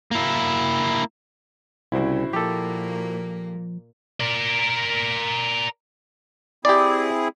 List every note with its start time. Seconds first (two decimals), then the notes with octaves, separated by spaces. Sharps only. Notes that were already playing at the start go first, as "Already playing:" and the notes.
0.11 A#3 E4
1.92 C2 C#3 E4 F#4 C5
2.33 A#2 F3 A#3 G4 A4
4.20 A#4 D5
6.65 C4 E4 G4 G#4 D5